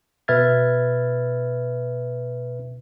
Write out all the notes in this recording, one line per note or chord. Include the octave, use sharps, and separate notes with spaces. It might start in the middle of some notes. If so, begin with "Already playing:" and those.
B2 B4 E5 F6 G#6 A6